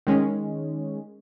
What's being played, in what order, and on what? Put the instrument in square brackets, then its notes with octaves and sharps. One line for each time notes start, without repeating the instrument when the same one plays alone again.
[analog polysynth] D#3 G#3 C#4